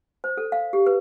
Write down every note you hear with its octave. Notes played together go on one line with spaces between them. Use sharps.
C5
A4
F5
G4
B4